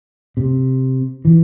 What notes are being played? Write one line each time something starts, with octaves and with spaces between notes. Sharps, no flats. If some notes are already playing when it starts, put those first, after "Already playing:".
C3
E3